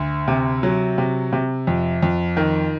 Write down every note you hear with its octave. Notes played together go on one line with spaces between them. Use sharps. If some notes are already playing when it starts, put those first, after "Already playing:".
Already playing: D2
C3
F#3
C3
C3
F2
F2
D#3